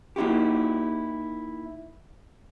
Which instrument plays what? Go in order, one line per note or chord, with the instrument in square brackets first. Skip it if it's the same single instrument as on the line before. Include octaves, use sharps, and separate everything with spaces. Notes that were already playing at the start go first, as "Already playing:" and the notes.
[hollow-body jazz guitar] A#3 D#4 E4 F#4 G4